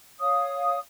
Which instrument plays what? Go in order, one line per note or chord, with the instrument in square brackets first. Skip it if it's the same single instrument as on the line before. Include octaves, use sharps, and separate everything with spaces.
[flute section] C#5 F5 D#6